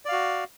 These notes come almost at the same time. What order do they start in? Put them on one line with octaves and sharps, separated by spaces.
D5 F5 F#4